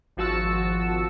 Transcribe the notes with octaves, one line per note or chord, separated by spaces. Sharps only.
G#1 F3 F#4 A5 E6 C#7